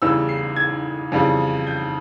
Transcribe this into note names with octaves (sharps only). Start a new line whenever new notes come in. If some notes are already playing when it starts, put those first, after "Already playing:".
E2 C#3 E3 G3 E6
C7
G#6
F2 C#3 E3 G3
G6